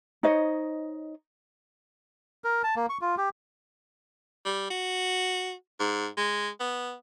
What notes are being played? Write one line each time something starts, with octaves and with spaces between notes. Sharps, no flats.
D#4 C5 C#5 D#5
A#4
A5
A#3
C#6
F4
G4
G3
F#4
G#2
G#3
B3